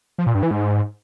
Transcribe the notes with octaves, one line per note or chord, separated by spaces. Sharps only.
F3
A#2
G2
E3
G#2